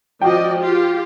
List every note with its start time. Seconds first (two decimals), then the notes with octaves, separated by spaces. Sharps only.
0.21 F3 F#4 D5 D#5 G5
0.59 F4 G4